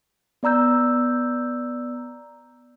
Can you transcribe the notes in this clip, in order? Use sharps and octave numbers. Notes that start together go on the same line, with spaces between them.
B3 D5 A#5 E6 G6